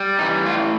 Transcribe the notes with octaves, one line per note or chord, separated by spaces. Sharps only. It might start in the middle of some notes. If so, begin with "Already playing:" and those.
Already playing: G3
E3 D#4
A2 F4